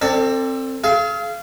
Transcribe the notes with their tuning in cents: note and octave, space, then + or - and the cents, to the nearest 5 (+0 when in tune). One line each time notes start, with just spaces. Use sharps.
C4 +10 A4 +35 D5 +0
G#4 +45 F5 -25